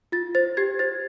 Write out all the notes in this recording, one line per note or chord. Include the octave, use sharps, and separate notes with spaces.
F4 A6
C5 A6
G4 G#6
C5 A6